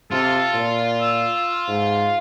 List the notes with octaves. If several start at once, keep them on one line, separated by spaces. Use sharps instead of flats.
C3 F4 A4
A#2
E6
G#2